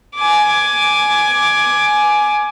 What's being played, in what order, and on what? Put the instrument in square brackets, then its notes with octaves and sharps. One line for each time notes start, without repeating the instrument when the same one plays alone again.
[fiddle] G#5 D6